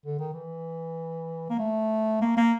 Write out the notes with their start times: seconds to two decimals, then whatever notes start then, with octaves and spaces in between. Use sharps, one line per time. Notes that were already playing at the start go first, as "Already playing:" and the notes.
0.06 D3
0.19 D#3
0.33 E3
1.50 A#3
1.59 A3
2.21 A#3
2.37 A#3